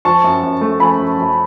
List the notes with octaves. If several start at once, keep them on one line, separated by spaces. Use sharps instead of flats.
F3 A5 C#6
F#2
F#2
A3
F3 G#5 B5
F#2
F#2